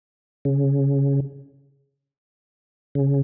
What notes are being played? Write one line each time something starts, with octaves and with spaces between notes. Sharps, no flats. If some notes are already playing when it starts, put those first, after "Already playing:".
C#3
C#3